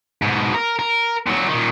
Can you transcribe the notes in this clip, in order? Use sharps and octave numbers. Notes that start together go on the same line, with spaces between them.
G#2 B2
A#4
A#4
A#2 F#3
A#2 D#3